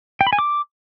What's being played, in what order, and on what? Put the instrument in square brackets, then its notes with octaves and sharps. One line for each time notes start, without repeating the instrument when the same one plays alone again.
[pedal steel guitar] G5
B5
G#5
D6